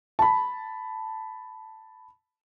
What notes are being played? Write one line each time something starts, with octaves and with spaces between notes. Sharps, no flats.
A5 B5